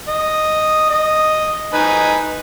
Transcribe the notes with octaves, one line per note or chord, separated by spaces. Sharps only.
D#5
D#5
D#4 B4 G#5